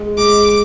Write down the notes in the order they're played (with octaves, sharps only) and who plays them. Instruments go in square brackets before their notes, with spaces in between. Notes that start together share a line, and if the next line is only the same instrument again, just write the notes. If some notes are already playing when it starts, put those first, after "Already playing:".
Already playing: [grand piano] G#3
[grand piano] G#3 [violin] D6